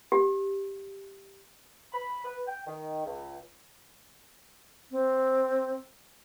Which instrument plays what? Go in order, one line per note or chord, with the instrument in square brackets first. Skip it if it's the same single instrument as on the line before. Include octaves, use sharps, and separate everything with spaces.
[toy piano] G4
[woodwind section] B5
B4
G5
D#3
C#2
[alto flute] C4